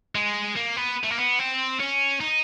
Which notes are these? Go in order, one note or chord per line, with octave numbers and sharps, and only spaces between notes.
G#3
A#3
B3
A3
A#3
B3
C4
C#4
D#4